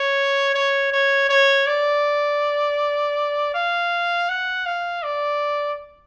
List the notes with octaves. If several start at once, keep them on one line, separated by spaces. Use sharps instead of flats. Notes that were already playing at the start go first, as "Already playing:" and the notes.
Already playing: C#5
C#5
C#5
C#5
D5
F5
F#5
F5
D5